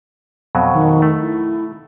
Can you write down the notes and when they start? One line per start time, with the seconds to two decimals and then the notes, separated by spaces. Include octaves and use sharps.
0.55 F2 B2 F#3
0.72 D#3
1.02 A3
1.21 E4